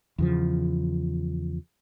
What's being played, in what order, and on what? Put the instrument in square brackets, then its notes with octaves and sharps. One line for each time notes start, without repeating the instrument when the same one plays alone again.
[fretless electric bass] E2 C#3 F3